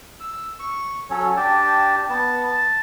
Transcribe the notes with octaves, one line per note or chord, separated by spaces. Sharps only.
E6
C#6
F#3 C#4 A4 C#5
D4 G4 G5 A5
B3 A5
A5